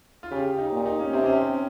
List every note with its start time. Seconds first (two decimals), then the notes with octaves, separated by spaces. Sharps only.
0.23 F4
0.31 C#3 G4
0.59 D#4
0.72 A#2
0.86 D#4
0.99 C#4
1.13 C3 C4
1.26 C#4